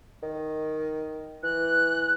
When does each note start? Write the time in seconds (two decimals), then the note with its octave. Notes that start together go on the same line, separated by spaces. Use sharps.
0.23 D#3
1.43 E3 F#6